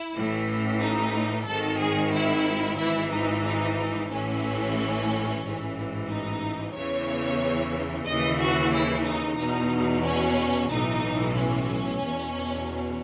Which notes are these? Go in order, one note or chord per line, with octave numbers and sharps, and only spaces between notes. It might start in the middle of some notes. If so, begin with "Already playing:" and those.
Already playing: E4
A1 A2 E3
D#4
G#1 G#2 D#3 A4
G#4
E4
G#1 G#2 E3 E4
D#4
D#4
A1 A2 E3 C#4
A1 G#2 E3
D#4
E2 C#3 E3 C#5
D#2 C#3 E3 D#5
F#4
E4
D#4
E2 B2 D#4
C#4
B1 A2 E3 D#4
C#4
E2 B2